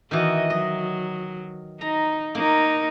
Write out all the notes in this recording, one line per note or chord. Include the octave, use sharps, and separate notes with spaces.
D#3 E3 F#4 D#5
F#3 D#5
D#4 A#5
A#3 D#4 A#4